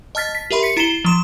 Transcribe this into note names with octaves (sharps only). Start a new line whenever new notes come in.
D#5 A5 F6 A6 B6
B6
G4 A#4 E5 B5 C6
B6 C#7
E4 A#5 C7 E7 G7
F3 C6 E7